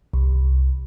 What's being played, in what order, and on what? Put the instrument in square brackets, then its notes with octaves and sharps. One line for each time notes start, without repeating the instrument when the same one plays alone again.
[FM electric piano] C2